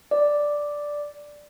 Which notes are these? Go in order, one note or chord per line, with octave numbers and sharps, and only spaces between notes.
D5